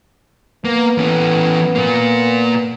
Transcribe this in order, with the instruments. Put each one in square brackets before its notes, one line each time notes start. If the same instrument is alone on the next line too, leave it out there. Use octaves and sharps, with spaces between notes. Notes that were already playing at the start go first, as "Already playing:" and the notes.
[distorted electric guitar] A#3 [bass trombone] B3
[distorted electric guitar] E3 C#4
A#2 A#3